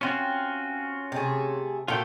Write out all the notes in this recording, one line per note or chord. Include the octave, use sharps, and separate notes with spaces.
C4 C#4 F4 F#4 G#5
C3 A3 G#4
A#2 A3 F4 F#4 A4 G5